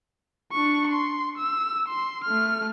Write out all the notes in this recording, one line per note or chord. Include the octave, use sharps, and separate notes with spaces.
D4 C#6
C6
E6
C6
A3 F6